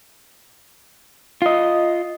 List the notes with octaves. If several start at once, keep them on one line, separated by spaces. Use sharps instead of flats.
F4 D#5